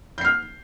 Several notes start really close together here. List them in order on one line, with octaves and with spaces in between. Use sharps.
G6 C7 F6